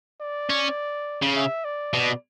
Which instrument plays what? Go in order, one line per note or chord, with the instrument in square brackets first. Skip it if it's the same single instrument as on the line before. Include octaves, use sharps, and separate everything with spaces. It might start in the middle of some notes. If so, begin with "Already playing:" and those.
[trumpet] D5
[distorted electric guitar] C#4
C#3
[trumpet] E5
D5
[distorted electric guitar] B2